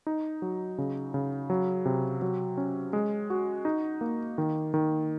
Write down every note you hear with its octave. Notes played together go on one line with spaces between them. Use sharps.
D#4
F#3
C#3
C#3
F#3
C3
F#3
C#4
G#3
F#4
D#4
A#3
D#3
D#3